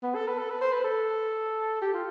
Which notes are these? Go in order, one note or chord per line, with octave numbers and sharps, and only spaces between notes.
B3
A4
B4
A4
B4
C5
B4
A4
G4
F4